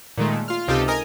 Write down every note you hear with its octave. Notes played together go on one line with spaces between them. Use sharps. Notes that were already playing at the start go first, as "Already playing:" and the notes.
A#2 D#3 G#3 A3
F4 F6
C#2 C3 D#4 F4 G4 A4
A#4 D#5 G#5 A#5 D#6 F6